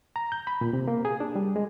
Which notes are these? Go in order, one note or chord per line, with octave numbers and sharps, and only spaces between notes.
A#5
G6
B5
A#2
C3
A#3
G#4
D4
G3
G#3